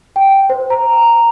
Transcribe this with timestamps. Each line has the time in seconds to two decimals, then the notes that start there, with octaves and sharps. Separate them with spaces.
0.16 G5
0.50 C5
0.70 A#5